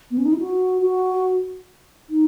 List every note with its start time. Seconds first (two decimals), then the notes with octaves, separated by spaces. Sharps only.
0.11 B3
0.18 C#4
0.25 D#4
0.33 E4
0.39 F#4
0.82 F#4
2.09 D#4